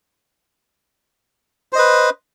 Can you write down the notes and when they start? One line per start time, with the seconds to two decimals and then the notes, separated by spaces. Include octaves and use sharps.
1.73 C5
1.75 D#5
1.78 B4